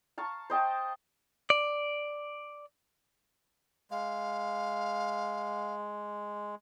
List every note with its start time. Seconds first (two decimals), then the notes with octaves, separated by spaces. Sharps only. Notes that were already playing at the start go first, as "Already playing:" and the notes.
0.18 F5 A5 A#5 C#6
0.50 C5 D#5 G5 A5
1.50 D5
3.91 G#3 F5